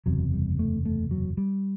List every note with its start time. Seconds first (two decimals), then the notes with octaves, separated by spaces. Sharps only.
0.06 F#1 E2 C3 F#3
0.33 G3
0.59 A3
0.85 A3
1.11 F#3
1.37 G3